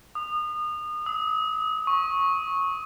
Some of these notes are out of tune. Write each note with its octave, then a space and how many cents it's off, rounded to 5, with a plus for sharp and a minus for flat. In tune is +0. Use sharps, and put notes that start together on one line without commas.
D#6 -30
D#6 +45
C#6 -10